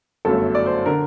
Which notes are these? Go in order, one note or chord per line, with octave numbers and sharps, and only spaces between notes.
G1 F#2 F#3 A3 A4
D5
C5
D3 A#4